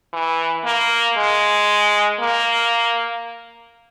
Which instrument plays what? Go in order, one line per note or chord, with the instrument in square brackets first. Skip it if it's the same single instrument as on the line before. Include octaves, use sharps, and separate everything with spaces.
[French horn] E3
A#3
G#3
A#3